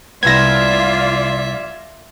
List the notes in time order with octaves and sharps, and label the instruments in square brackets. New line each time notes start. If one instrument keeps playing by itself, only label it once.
[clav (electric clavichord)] C2 B3 [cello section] F4 D5 [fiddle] E5 [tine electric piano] G#6 A#6